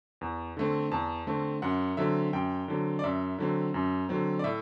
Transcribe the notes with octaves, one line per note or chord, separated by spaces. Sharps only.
E2
D3 A3 C4
E2 A5
D3 A3 C4
F#2 F#5
D3 F#3 C4 E5
F#2 G5
D3 F#3 C4
D5
F#2 E5
D3 F#3 C4
F#2
D3 F#3 C4
D5
A2 E5